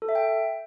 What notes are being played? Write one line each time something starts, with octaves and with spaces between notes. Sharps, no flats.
A4
E5
G5